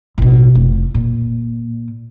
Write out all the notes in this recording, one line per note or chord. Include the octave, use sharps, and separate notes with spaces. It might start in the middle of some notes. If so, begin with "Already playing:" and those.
A1 B2
F1
A#2